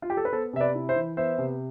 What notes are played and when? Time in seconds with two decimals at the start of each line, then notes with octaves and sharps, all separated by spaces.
0.02 F4
0.10 G4
0.17 A4
0.25 B4
0.32 B3 A4 C5
0.53 C3 E5
0.60 B4 D5
0.75 E4
0.89 C5 E5
0.96 E3
1.17 B3 C5 E5
1.38 C3